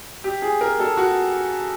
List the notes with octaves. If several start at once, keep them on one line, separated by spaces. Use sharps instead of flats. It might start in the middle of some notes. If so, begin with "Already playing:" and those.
G4
G#4
A#4
A4
F#4